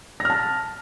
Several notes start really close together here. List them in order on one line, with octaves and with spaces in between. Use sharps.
A#6 F6 A5